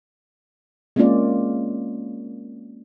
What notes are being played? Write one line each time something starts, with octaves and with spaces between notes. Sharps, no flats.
G#3 A#3 C4 C#4 F4 D5